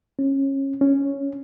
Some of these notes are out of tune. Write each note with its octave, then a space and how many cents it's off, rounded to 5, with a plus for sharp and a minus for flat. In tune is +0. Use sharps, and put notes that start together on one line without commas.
C#4 -25
C#4 +0